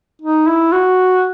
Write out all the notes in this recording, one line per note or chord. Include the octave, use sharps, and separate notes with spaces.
D#4
E4
F#4